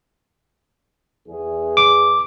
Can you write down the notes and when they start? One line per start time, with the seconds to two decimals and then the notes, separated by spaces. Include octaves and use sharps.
1.28 E2 G#4
1.77 D6